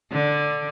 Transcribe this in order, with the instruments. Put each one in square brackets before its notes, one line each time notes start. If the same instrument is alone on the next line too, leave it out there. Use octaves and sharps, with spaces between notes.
[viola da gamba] D3